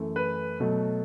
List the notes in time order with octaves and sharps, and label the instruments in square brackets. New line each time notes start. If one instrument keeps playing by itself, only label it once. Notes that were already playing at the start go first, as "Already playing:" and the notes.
Already playing: [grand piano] F#2 E3 A3
B4
B2 F#3 A3